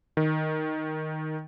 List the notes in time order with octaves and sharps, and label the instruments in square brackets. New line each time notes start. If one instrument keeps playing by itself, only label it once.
[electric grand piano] D#3